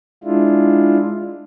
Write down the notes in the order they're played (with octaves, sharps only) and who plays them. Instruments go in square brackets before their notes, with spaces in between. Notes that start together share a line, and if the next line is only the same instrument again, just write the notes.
[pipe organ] G#3 D4 E4 F4